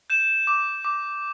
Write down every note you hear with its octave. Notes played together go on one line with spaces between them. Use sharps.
G6 E7
D6
D6